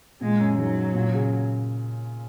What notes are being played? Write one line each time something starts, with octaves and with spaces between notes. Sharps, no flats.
A#2 G#3
F#2
G#2 F#3
A#2
C#3